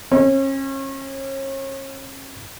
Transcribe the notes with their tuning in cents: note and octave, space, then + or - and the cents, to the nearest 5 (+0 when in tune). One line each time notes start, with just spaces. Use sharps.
C#4 -35